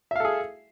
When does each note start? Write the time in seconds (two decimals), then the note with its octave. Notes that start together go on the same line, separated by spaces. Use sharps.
0.11 E5
0.16 F5
0.20 A4
0.25 G#4